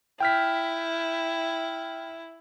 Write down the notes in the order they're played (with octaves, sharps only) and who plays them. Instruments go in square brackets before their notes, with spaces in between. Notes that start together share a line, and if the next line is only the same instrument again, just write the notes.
[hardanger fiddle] E4 [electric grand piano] G5 F6 B6